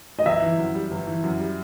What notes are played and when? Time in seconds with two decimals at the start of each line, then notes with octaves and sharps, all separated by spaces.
0.19 D#5
0.26 G1 E5
0.42 E3
0.58 F#2
0.74 G3
0.91 G1
1.07 E3
1.23 F#2
1.40 G3